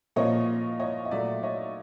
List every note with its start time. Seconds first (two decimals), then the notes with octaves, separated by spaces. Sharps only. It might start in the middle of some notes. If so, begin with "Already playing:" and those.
0.16 A#2 F3 A#3 C#5 D#5
0.80 C#5 D#5
1.05 D#5
1.11 A#2 F#3 A3 D5 E5
1.43 C#5 D#5